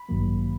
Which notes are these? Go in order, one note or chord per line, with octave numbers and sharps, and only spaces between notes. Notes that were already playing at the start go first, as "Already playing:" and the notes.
Already playing: B5
A1 G2 D#3 F#3 A#3